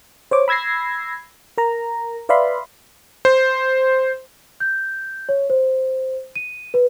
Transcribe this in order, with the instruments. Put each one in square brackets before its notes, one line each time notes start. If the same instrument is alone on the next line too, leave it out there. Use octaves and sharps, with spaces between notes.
[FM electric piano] C5 C#5 D6
B5 E6 G#6 A#6 C7
A#4 A#5
B4 D5 E5 F5 B5 C6
[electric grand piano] C5
[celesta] G6
C#5
C5
D#7
B4